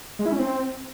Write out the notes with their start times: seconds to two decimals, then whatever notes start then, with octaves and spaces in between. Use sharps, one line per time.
0.19 G#3
0.26 E4
0.32 C#4
0.39 C4